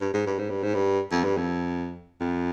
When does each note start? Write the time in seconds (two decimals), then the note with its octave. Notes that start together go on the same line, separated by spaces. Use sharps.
0.01 G2
0.14 G#2
0.26 G2
0.39 G#2
0.50 G2
0.63 G#2
0.75 G2
1.12 F2
1.24 G2
1.37 F2
2.20 F2